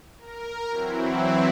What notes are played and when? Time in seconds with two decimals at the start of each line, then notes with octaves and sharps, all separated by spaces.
0.18 A#4
0.70 E3 F#3 C4 E4